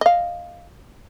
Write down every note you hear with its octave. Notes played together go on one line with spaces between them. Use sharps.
D#5 F5